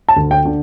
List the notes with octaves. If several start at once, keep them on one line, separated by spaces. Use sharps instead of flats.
A5
D2
G5
D3